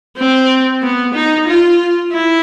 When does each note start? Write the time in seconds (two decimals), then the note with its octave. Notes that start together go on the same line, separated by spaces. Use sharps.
0.17 C4
0.83 B3
1.14 D#4
1.47 F4
2.13 E4